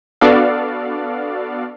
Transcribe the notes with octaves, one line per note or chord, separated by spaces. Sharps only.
B3 D4 F#4 A4 D5 F5